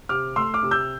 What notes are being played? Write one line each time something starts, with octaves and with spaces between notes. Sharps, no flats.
C3 D6 F6
A3 C6 E6
D6 F6
C3
E6 G6